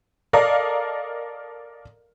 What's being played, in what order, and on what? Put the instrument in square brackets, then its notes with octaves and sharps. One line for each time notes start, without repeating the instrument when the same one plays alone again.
[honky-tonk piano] A4 A#4 D5 D#5 F5 A#5